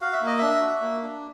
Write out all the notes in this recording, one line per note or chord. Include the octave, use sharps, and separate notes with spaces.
F#4 F5
E5
A#3
D#5
D4 E5
F#4
A#3
D4